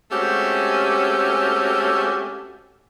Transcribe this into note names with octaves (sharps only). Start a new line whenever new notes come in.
G#3 A3 C4 C#4 F#4 G4